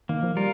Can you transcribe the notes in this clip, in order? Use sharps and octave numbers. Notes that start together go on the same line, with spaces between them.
D#3 A#3
F3
G3 F4 A#4